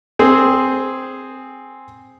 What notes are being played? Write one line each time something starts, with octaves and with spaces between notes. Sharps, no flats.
C4 G#4